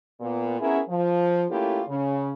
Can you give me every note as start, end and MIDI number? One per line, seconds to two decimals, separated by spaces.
0.21 0.56 46
0.21 0.56 59
0.60 0.79 59
0.60 0.79 61
0.60 0.79 64
0.60 0.79 68
0.60 0.79 70
0.89 1.44 53
1.49 1.82 57
1.49 1.82 58
1.49 1.82 61
1.49 1.82 64
1.49 1.82 65
1.49 1.82 67
1.88 2.31 49